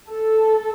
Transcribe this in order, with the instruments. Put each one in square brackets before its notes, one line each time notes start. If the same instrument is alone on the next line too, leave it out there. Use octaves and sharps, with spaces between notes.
[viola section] A4